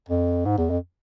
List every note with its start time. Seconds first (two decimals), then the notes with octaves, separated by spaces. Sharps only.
0.09 F2
0.46 G#2
0.58 E2
0.70 F2